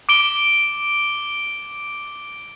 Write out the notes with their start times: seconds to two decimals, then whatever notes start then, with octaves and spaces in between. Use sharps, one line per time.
0.09 D6 D7 G7